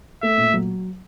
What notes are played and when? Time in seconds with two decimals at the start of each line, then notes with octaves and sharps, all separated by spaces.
0.22 A3 E5
0.38 A#2
0.54 F#3